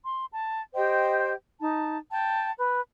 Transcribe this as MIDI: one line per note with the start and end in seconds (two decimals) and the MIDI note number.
0.05 0.24 84
0.32 0.62 81
0.74 1.33 67
0.74 1.33 72
0.74 1.33 75
0.74 1.33 79
1.59 1.98 63
1.59 1.98 81
2.11 2.52 79
2.11 2.52 81
2.58 2.81 71